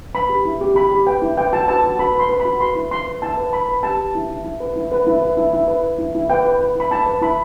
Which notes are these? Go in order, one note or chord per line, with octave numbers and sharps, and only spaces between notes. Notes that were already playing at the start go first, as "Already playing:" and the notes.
B4 B5
G4
E4
G4
G4 B5
G4
B4 G5
E4
B4 G5
F#4 A5
B4 A5
F#4
B4 B5
B4 C6
B4
B5
F#4
B4 C6
E4
E4 C6
B4
E4 A5
B4
B4 B5
B4
G4 A5
G4
E4
E4
E4
B4
E4
B4
E4
B4
E4
E4
B4
B4
E4
E4
B4 G5
B4
B4
E4 B5
E4 A5
B4
E4 B5